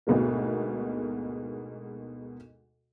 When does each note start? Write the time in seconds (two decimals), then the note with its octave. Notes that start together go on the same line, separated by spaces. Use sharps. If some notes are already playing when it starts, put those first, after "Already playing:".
0.07 D2 G#2 B2 G#3 A#3